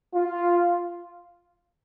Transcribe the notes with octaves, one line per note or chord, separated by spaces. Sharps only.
F4